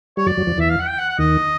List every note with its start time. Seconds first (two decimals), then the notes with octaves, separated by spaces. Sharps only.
0.17 G3 C#5
0.26 F#2 F#3 D5
0.37 F#2 F#3
0.47 F2 F3
0.58 E2 E3 E5
0.69 F5
0.79 F#5
0.88 G5
0.98 F#5
1.09 F#5
1.18 D#2 D#3 D#5